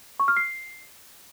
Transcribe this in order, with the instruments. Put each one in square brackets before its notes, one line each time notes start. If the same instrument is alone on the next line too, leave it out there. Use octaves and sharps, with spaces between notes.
[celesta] C#6
F6
C7